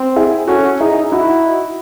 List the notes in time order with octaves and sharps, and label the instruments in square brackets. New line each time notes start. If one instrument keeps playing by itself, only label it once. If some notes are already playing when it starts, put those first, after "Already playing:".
Already playing: [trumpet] C4
[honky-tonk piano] E4 G#4
[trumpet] C#4 [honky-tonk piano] F#4 A4
[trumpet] D#4 [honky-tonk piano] E4 G#4
[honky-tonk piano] D#4 F#4 [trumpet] E4